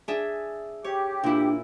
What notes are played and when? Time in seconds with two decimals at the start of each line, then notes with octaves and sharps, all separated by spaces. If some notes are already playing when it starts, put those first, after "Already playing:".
0.08 D4 G#4 E5
0.84 G4 C#5
1.24 A#2 D4 E4